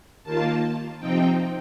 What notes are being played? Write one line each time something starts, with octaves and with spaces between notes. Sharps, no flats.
D#2 D#3 A#3 F4 A5
C3 F3 C4 D#4 G5